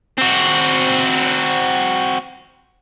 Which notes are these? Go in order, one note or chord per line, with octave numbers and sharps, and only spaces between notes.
C4 F#4